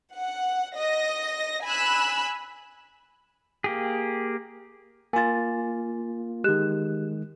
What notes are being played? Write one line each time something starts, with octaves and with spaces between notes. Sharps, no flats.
F#5
D#5 A#6
G#5 B5 E6 F#6
A#3 G4 G#4
A#3 F4 G#5 A6
D#3 G#3 G4 F#6 E7